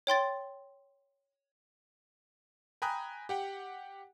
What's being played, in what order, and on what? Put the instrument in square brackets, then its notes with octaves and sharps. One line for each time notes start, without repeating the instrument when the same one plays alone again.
[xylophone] C#5 G5 C6 A6
[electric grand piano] G5 G#5 A#5 B5 D#6 F#6
G4 F#5 G5